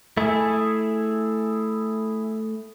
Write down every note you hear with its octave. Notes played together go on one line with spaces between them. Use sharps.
A3 E4 G#4